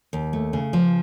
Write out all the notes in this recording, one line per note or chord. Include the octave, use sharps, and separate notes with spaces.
D#2
A3
C#3
F3